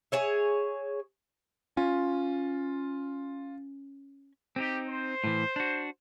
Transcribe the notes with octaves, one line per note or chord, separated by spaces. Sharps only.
G#4 C#5 E5
C#4 F4
C4 C#4 D#4 G4
C5
A2 E3
D4 F#4